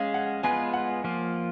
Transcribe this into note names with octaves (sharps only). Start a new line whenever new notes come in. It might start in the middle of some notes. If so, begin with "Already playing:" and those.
Already playing: G#3 C#4 G#4 F5
F#5
G#3 B3 F4 B4 G#5
F#5
F3 A#3 F4